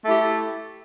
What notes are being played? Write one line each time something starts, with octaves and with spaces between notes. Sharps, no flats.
A3 E4 G4